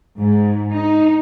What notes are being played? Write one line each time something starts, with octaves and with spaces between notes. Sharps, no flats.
G#2
D#4